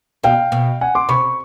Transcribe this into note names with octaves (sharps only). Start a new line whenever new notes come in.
B2 F5 G5
B2
F#5 G#5
C6 D6
C3 B5 C#6